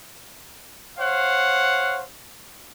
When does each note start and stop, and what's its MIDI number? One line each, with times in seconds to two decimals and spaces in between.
0.98 2.03 72
0.98 2.03 73
0.98 2.03 77
0.98 2.03 78